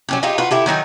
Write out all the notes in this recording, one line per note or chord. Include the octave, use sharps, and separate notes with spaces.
F#3 C#4 G4
D#4 F4 G4 G#4
F4 F#4 B4
E4 G4 A4
D#3 F#3 D#4 G#5